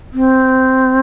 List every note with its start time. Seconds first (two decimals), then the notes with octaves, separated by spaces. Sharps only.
0.13 C4